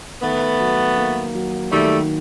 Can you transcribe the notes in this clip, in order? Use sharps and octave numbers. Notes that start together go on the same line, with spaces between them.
D#3 A3 B3
F#3
A#3
F#3
D#3 G3 A3